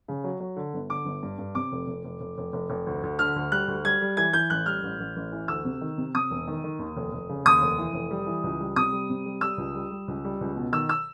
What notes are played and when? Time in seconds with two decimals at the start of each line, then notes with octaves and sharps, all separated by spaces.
0.08 C#3
0.24 F#3
0.40 F#3
0.56 D3
0.74 G1
0.90 D3 D6
1.06 G1
1.23 G2
1.39 G2
1.55 C3 D6
1.72 F1
1.87 F1
2.04 F1
2.21 F1
2.38 F1
2.53 F1
2.70 F1
2.87 D2
3.03 D2
3.19 D3 F6
3.36 D2
3.52 G3 F#6
3.68 D2
3.85 G3 G#6
4.01 G3
4.17 E3 G#6
4.33 E3 G6
4.50 A1 F#6
4.66 G3 F6
4.83 A1
5.00 A1
5.16 A1
5.32 E3
5.48 D2 E6
5.65 C3
5.81 D#3
5.98 C3
6.15 C3 D#6
6.30 E1
6.47 D#3
6.64 D#3
6.79 D#2
6.97 F1
7.12 F1
7.29 C#3
7.45 D#2 D#6
7.62 F1
7.78 E3
7.94 F1
8.11 G3
8.27 E3
8.44 C#2
8.60 G3
8.76 C3 D#6
8.92 G3
9.10 C3
9.26 G3
9.41 G3 E6
9.58 C#2
9.74 G3
9.91 G3
10.08 C#2
10.24 G3
10.41 C#2
10.56 B2
10.72 D#3 E6
10.89 E6